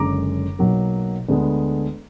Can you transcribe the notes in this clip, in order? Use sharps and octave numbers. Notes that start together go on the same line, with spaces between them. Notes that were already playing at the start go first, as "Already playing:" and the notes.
Already playing: F#1 F#2 D3 G#3 A#5 D6
B1 B2 F#3 A#3
D2 D3 G#3 B3 D4